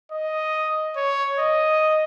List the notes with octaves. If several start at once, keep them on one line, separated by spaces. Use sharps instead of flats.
D#5
C#5
D#5